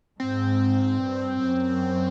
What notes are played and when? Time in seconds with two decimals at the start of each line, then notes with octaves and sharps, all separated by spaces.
0.19 G#2 C4
1.03 G2
1.43 F#2